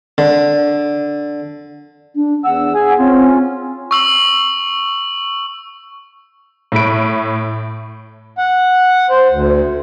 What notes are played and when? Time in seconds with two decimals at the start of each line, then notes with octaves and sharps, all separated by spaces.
0.18 D3
2.16 D4
2.44 E2 F#5 E6
2.75 G#4 G#5
2.99 C4 C#4 F4
3.91 C#6 E6 F#7
6.72 A2 E5 B5 D7
8.38 F#5
9.10 C5
9.31 D2